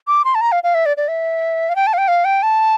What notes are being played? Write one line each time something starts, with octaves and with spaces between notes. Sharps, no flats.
D6
C6
A5
A#5
F5
F5
E5
D5
D5
E5
F5
G5
A5
F5
G5
F5
G5
A5